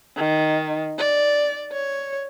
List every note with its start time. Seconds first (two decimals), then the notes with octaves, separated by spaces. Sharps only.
0.17 D#3
0.98 D5
1.72 C#5